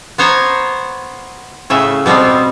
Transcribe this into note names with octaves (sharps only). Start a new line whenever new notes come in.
B3 C5 C#5 A#5
A2 C#3 E5
B2 G3 B3 C4